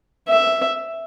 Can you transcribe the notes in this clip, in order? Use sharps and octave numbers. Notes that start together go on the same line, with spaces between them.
E5